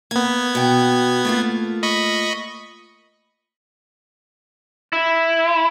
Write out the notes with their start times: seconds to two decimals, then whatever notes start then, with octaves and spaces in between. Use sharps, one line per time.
0.11 A#3 B3 G#6
0.55 B2 G5
1.25 A3 A#3 F4
1.83 D#5 B5 C#6
4.93 E4